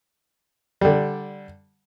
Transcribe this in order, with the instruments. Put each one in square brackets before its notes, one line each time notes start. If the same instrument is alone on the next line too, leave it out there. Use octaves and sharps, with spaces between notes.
[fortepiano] D3 G3